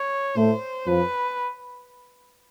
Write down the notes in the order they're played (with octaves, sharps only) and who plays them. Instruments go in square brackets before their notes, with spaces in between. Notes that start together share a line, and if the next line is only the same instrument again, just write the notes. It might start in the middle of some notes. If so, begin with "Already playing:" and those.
Already playing: [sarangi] C#5
[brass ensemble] A2 A3 [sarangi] C5
[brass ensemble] F2 F3 [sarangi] B4